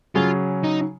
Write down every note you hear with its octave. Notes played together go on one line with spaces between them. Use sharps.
C#3 F#3 C#4 F4 G#4 C#5
D#4